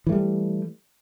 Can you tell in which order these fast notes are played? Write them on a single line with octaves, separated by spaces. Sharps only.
E3 A3 G3